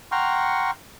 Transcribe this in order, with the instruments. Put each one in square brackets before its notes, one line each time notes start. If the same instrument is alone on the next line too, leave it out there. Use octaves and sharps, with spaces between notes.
[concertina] F#5 G5 A#5 C6 C#6 F6